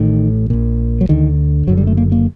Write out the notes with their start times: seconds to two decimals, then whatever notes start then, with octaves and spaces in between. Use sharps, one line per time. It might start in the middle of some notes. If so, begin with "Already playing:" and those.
Already playing: A1 A2 D#3
0.50 A#1 A#2
1.01 F#3
1.09 D2 D3 D#3
1.67 F#1 F#2 D3 F#3
1.77 G3
1.87 A3
1.97 A#3
2.12 A#3